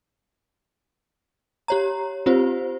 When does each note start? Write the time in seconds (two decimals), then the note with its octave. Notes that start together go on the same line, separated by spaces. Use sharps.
1.68 G4 C#5 A#5
2.26 C4 F4 G4 C5